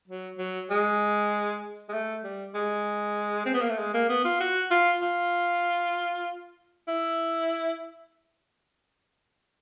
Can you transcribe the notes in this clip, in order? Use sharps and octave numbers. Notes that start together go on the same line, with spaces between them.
F#3
F#3
G#3
G#3
A3
G3
G#3
C4
B3
A#3
A3
G#3
A#3
B3
F4
F#4
F4
F4
E4